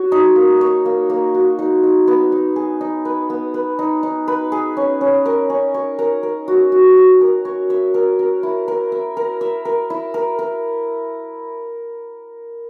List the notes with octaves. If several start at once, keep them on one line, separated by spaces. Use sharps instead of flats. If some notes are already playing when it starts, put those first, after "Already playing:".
Already playing: F#4 C#5
D#4
A#3
C#5
A#3
A#3
F#4
D#4
D#4
B3
D#4
G#4
D#4
B4
B3
B4
D#4
D#4
B4
G#4
C#4
C#4
A#4
C#4
C#5
A#4
A#4
F#4
F#4
F#4
A#4
C#5
E5
A#4
A#4
E4
A#4
E5
A#4
E5
A#4
E4
A#4
A#4